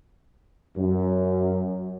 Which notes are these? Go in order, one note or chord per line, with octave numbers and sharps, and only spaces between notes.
F#2